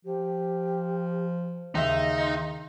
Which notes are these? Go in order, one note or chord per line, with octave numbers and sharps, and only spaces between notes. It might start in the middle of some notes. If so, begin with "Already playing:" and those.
F3 G4
D#2 C#3 D#4 E5 C6